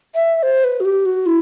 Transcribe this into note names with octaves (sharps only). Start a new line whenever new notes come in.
E5
C5
B4
F#4
G4
F#4
E4